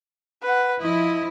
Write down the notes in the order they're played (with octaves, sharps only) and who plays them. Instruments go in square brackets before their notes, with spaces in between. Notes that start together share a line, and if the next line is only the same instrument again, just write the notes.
[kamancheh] B4 F#5
[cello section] F3 E4 [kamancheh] D#5